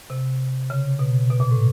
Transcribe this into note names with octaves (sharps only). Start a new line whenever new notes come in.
C3
C#3
B2
B2
A#2
A2